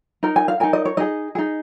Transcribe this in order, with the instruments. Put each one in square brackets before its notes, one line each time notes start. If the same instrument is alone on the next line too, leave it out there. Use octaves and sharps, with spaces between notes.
[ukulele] D#4 A#4
G#5
F5
D#4 A#4 G#5
D#5
C#5
D#4 G#4 D#5
D#4 G#4